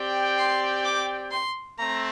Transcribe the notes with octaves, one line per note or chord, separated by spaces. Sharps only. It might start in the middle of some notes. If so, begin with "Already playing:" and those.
Already playing: C4 G4 D5 G5
C6
D6
C6
A3 C4 A#5